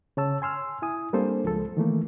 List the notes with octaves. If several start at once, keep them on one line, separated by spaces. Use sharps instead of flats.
C#3 C#5 A5 E6
G#5 C6 E6 F6
E4 G#5 D#6
G3 A#3 C4 D4 A4 C5
C#2 F3 G#3 A4
D#3 E3 A3 A#3